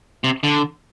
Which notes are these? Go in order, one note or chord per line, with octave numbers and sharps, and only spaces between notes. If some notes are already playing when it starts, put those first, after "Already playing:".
C3
D3